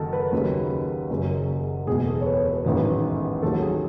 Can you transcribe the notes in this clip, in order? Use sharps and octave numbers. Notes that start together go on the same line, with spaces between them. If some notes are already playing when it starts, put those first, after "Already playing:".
Already playing: F#1 D#3 F#3 A4
B4
D#2 C#3 F#3
F#1 F#2 C#3 F#3
E1 E2 B2 G#4
A4
C#5
B4
B4
A1 G#2 D#3 F#3 B4
D#2 D#3 F#3 A4
G#4